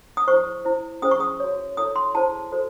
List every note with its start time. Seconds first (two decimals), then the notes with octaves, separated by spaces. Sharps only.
0.17 D#6
0.27 E4 G#4 C5 C#6
0.65 E4 C5
1.02 C#4 G#4 C5 D#6
1.11 C#6
1.20 D#6
1.40 F#4 C#5
1.77 E4 A4 C#5 D#6
1.96 C6
2.15 E4 G#4 C5 A5
2.52 F#4 A4 C5